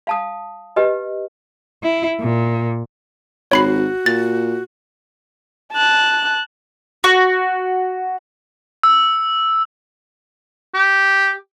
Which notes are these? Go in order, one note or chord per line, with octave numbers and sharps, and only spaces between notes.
F5 A5 D#6
G4 B4 D#5
E4
A#2
G#1 F#4 C#5 B5 C7
A#2 A6
A5 F#6
F#4
E6
G4